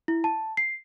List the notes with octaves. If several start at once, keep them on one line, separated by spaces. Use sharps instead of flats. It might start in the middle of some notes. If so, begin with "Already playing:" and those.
E4
A5
C7